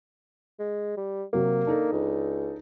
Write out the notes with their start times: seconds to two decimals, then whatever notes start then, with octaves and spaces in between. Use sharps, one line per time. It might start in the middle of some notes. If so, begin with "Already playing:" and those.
0.59 G#3
0.97 G3
1.33 C3 F#3 A#3 A#4
1.67 D4 D#4 A4
1.92 C#2